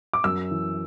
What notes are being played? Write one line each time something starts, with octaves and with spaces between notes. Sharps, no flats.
D6
F#2 E6
E3